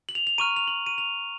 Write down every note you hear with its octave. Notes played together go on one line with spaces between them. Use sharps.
F#7
F7
F7
A#5 C#6 F6 D#7
F7
F#7
D#7
F7